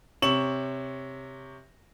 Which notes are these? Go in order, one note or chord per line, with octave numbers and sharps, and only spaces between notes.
C3 C#5 C#6 E7 F#7